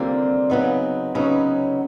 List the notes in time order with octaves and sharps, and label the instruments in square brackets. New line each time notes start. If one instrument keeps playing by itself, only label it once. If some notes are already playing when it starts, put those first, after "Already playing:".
Already playing: [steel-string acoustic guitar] D3 G3 A#3 [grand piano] C4 F4
[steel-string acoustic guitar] C#3 F#3 B3 D#4
[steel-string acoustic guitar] C#3 F#3 B3 D#4 [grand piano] C#4